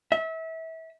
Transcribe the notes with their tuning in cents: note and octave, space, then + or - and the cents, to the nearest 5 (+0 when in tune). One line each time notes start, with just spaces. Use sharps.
E5 -30